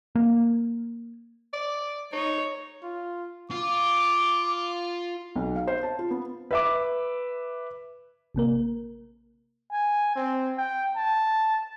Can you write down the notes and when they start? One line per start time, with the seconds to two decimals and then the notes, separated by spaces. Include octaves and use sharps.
0.15 A#3
1.53 D5
2.13 D#4 C#5
2.83 F4
3.51 F4 D6
5.36 B1
5.56 F5
5.67 C5
5.83 A5
5.99 F4
6.11 B3
6.51 B4 E5 D6
8.35 A1 C3 A#3 A#4
9.72 G#5
10.16 C4
10.57 G5
10.96 A5